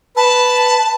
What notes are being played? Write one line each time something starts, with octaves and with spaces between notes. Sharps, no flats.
B4 A5